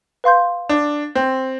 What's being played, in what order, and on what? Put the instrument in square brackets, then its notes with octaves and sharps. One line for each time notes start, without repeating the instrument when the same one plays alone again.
[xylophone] B4 F5 C6 G6
[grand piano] D4
C4